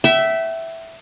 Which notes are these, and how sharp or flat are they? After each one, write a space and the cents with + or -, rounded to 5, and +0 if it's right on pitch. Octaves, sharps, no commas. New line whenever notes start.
E5 +0 G5 -40